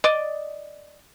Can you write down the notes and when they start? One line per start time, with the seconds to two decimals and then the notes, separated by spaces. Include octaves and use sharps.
0.04 D5 D#5